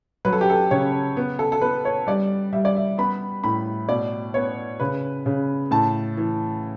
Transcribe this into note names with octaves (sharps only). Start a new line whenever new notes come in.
F#3 B4
A4
G4
A4
C#3 C#5
B3
A4
A4
B3 B4
C#5
G3 D5
G3 E5
D5
E5
B3 B5
A2 B5
B2 D5
B3 C#5
C#3 B4
C#3
A2 A5
E3